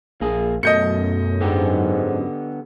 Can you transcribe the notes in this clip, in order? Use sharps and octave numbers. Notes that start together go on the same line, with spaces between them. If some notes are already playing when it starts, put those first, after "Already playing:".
A#1 A#3 G#4
F#2 B2 A3 D#5 G6 C#7
G#2 D3 B3 G4